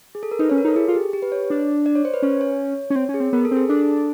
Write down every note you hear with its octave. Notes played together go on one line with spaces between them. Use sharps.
G#4
A4
A#4
D#4 B4
C#4 C#5
A#4
D#4 A4
E4 G#4
F4
G4
G4
B4
C#5
D4
D5
C#5
C5
B4
C#4 C#5
C#5
C#4
C4 C#5
C#4
G#4
C4
B3 A#4
A4
C4
G#4
D4 A4